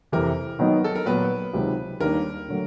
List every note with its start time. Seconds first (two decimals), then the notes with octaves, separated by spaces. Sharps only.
0.12 F2 C3 E3 A#4
0.59 D#3 F#3 B3 D#4
0.84 A4
0.95 A#4
1.06 A#2 F#3 B3 B4
1.53 C#2 C3 D#3 F#3
2.00 D#2 D#3 G3 A#3 D4 A#4
2.48 D3 F#3 A3